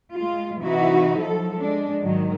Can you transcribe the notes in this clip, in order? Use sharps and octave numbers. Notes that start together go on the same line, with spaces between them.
G#3 F4
C3 E3 D#4 E4 F#4
F3 F#3 A4
G#3 D4
G#2 D#3 F#3 G#3